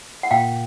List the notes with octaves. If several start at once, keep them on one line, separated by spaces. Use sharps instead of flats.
F#5
A#2 F5 G5